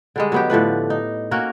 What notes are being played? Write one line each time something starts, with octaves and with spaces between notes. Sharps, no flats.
D3 G3 G#3
F#3 B3 G4
A2 D3 F3 B4
D#4
A#3 C#4 F#4 A#4